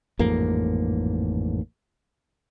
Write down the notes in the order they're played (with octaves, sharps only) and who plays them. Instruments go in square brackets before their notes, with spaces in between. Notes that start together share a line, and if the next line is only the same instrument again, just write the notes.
[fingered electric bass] A1 F2 G#2 A#3